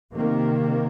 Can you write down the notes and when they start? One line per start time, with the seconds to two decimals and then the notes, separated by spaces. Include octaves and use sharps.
0.14 C3 D#3 A#3